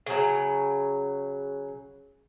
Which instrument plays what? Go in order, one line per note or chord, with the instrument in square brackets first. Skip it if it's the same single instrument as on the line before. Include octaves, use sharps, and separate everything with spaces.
[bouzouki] C#3 F#3